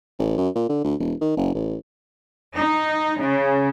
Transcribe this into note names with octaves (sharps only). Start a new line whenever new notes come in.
A1
F#2
A#2
D3
D2
E1
D#3
F#1
A1
D#4
C#3